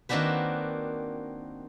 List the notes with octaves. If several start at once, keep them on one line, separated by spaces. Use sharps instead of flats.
D#3 A#3 C4 D4 F#4 B4